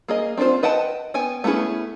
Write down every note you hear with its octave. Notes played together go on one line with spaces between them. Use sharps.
A#3 G#4 D#5
C4 D4 D#4 F4 C5
B4 D#5 F#5 G5 A5
B3 G5 G#5
A3 B3 C#4 E4 G#4